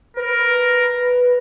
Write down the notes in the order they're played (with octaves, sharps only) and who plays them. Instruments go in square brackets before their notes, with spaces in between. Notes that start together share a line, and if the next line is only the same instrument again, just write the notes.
[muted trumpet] A#4 [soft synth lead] B4